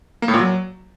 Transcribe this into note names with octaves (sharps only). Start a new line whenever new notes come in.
A#3
A2
A#2
F#3